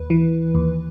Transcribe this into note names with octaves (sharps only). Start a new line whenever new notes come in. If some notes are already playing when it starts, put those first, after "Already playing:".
Already playing: D#2 B4
E3
D#2